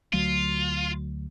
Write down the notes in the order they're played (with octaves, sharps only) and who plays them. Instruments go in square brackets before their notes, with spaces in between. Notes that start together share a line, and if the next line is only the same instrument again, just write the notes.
[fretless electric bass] D2 F#3 A3 [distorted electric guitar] F4